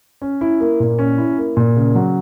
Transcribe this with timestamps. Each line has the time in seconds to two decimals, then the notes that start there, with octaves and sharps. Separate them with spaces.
0.22 C#4
0.41 E4
0.60 A#3
0.80 A#2
0.99 C#4
1.18 E4
1.38 A#3
1.57 A#2
1.76 C#3
1.95 F#3